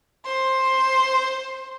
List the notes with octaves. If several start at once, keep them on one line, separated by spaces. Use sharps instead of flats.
C5 C6